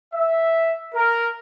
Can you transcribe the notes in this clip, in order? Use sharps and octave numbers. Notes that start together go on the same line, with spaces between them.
E5
A#4